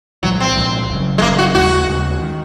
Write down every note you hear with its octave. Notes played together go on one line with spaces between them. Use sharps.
C2 A#2 F3 F#3 G#3
C4
C2 A#2 F3 G#3
F#1 F#2 C#3
G#3
F#1 F#2 C#3 A#3
F#4
D#2 C#3 G#3 F#4
D#2 C#3 G#3
D#3